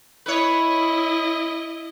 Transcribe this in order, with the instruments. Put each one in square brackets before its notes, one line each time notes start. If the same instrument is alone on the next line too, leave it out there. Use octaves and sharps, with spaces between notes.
[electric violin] E4 D#5 [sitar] B4 C#5